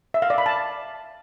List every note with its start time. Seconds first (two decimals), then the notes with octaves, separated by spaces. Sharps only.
0.14 E5
0.22 F5
0.30 D5
0.38 B5
0.46 A5